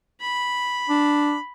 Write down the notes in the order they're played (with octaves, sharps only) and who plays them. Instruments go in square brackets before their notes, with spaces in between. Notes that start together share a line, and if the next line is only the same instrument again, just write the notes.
[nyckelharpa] B5
[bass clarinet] D4